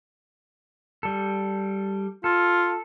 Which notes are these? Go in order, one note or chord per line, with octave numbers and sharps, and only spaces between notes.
G3 A4
F4 A4